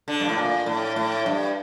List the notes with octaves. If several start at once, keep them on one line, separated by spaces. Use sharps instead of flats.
D3
G2
A2
A#2
A2
A2
G2